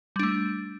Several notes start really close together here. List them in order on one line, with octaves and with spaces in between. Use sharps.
G3 D4 A3